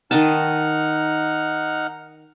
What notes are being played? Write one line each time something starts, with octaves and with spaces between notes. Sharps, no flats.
D#3 D#4 D#5 F#5 A5 F6